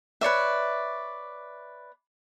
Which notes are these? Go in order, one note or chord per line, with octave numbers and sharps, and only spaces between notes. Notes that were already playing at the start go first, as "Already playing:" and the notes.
B4 C#5 D5 E5